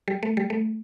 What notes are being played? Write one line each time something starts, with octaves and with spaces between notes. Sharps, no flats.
G3
A3
G3
A3